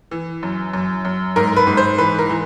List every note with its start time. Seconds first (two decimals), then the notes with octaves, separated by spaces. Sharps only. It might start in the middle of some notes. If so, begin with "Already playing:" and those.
0.11 E3
0.43 F#2
0.73 F#2
1.05 F#2
1.36 G#2 A#4
1.56 B4
1.67 G#2
1.77 C5
1.98 E3 B4
2.19 A#4
2.29 E3